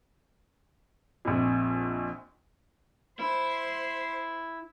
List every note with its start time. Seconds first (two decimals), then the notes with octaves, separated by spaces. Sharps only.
1.25 A#1 F2
3.19 E4 C5